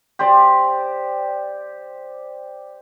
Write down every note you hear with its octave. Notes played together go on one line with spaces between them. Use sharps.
G4 C5 D5